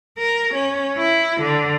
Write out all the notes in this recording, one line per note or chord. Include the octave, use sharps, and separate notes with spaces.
A#4
C#4
E4
D3